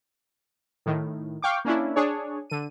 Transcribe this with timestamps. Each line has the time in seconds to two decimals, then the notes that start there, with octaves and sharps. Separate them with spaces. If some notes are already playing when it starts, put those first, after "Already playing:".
0.86 A2 D#3
1.42 F5 G5 C#6 D6
1.65 A#3 C#4 D4 E4
1.96 D4 G#4 C#5
2.50 D3 D#7